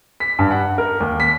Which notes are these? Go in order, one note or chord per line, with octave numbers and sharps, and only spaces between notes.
B6
G2
F#5
A#4
D#2
B6